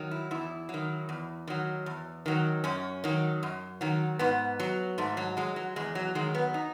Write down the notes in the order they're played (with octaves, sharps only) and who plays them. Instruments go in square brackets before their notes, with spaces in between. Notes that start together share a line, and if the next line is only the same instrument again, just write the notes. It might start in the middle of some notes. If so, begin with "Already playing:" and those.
Already playing: [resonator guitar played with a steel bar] D#3 F#3
E4
E2 E4
F#3
D#3
E2
D#3 F#3
E2
D#3 F#3
F#2 C#4
D#3 F#3
F#2
D#3 F#3
G#2 B3
F#3
G#2 A3
F#3
F#3 G#3
F#3
E2 G#3
F#3
D#3 F#3 G#3
B3
D#4